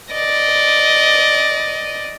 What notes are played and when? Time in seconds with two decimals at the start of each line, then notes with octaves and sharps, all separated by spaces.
0.11 D5 D#5